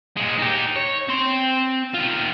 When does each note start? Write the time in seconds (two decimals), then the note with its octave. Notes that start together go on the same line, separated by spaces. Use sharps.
0.17 A#2 G#3
0.38 D#4 G4
0.76 C#5
1.08 C4 C6
1.94 D#3 F4